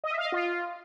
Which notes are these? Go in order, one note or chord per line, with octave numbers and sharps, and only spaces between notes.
D#5
E5
F5
D#5
F4